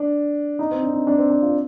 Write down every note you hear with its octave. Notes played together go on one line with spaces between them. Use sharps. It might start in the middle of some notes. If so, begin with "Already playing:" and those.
Already playing: D4
D#4
C4
D4
D#4
D4
C4
D4
F4